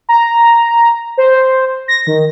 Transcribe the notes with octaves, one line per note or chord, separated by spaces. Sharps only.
A#5
C5
A#6
D#3